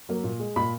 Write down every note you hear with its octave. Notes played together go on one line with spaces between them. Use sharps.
F#3 A#3
A#2
G#3
A#2 B5